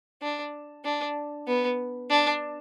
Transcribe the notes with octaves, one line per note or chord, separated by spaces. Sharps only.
D4
D4
B3
D4